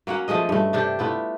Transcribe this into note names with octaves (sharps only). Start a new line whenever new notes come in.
F#3 A#3 C#4 F#5
F3 A3 G#4 D#5
G2 A3
C3 D4 G4 A4
A3 B3 E4 F4